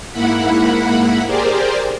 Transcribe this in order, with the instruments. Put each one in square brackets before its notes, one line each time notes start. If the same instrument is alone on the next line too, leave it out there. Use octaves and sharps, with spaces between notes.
[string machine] G#2 A#3 E4 F#5 B5
G4 G#4 A#4 C5 D5